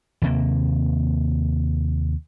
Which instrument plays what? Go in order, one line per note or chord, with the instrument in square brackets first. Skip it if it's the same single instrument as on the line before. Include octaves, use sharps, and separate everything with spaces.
[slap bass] D#2 C3 A#3